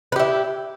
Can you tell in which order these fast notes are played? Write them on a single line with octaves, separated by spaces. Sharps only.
B4 G4 E4